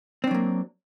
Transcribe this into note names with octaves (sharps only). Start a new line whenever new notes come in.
F#3 A#3 C4 D4